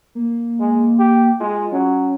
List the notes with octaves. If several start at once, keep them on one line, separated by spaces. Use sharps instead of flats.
A#3
G#3
G4
G#3 F4
F#3 C#4